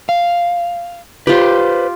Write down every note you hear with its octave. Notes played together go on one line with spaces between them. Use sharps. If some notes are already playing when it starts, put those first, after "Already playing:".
F5
F4 G4 B4 C5